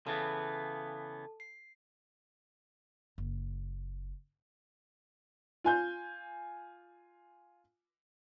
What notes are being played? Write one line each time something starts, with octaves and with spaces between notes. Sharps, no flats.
C#3 E3 B3 A4 A5
C7
F#1
F4 G#5 G6